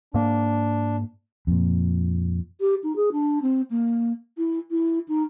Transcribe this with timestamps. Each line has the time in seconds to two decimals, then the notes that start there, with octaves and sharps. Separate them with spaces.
0.14 G#2 A#3 D4
1.47 F2 A#2
2.61 G4
2.83 D#4
2.96 G#4
3.12 D4
3.42 C4
3.71 A#3
4.38 E4
4.71 E4
5.08 D#4